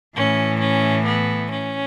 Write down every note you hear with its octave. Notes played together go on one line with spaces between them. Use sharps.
A2 E3 C#4
C#4
B3
C#4